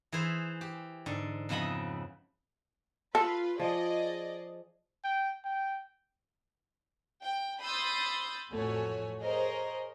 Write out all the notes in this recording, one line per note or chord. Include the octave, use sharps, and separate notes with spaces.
E3 G#4 C5 E5
G4
G#2 D3
F2 C#3 B3 D#5 E5 B5
F4 A4 B4
F3 G#4 D5 D#5
G5
G5
G5
B5 C6 D#6 E6 G6 A6
A1 F2 A3 F#4 C#5 G#5
G#4 A#4 C5 C#5 D#5